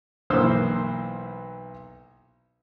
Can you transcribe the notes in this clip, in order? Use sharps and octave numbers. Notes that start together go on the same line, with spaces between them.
B1 E3 A#3 B4 C5 E6